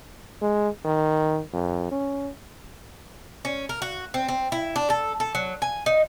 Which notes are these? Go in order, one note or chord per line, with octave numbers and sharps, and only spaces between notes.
G#3
D#3
F2
C#4
C#4
A#4
F#4
C4
C4
E4
D4
A4
A4
F#3
G#5
D#4